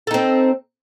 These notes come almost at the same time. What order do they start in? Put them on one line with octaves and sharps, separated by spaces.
A4 D#4 C4